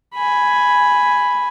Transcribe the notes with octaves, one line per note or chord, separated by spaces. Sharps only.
G#5 B5